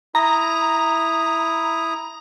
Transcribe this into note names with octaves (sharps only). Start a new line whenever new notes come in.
E4 A#5 D#6